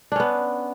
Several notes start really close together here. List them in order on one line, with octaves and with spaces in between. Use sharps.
D4 C#4 B3